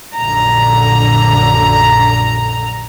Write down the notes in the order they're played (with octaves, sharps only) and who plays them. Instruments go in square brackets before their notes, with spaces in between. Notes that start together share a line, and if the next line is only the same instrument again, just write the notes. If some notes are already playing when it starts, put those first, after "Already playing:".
[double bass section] A#1 F#2 D3 [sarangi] A#5